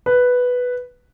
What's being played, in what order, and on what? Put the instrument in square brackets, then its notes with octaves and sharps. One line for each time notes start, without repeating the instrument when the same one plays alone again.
[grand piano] B4